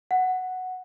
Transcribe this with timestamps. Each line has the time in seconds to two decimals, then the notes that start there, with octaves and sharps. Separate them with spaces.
0.11 F#5